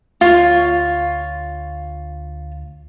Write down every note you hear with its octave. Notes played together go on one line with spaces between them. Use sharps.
D2 F4 C#5